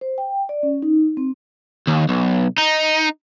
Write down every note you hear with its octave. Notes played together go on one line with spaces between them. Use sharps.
C5
G5
D5
C#4
D#4
C4
D#2
B1
D#4